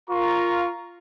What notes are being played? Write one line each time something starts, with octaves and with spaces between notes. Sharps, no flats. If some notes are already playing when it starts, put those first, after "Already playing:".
F4 A#4 A#5 C#6